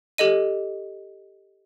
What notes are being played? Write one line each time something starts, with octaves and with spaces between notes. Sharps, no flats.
G4 A4 D#5 D#7